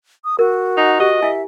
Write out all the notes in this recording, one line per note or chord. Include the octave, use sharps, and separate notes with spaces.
D#6
F#4 A#4
D#4 F#5 G#5
G4 D#5
E4 E5 G#5